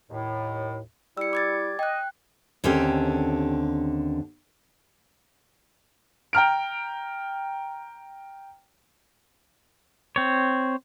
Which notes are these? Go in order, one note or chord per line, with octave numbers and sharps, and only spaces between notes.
D#2 A2
G3 E4 E6 C#7
D6 G#6 A6
D#5 G5 F#6
D#2 D3 C4 C#4 G4
G5 A#5 F6 D7
C4 C#5